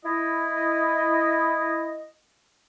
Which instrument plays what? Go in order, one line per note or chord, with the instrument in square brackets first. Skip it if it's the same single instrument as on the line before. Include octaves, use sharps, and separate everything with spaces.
[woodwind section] E4 D#5